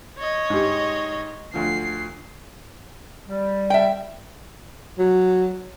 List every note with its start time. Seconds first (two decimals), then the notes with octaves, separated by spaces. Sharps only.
0.19 C#5 D#5
0.50 G#2 G4
1.54 D2 F3 C7
3.28 G3
3.70 E5 G5
4.99 F#3